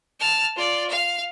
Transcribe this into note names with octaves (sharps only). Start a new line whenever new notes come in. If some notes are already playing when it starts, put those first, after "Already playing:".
A5 F6
F4 D5
F5